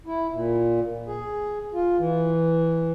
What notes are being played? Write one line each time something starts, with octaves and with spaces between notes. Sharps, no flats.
E4
A#2
G#4
F4
E3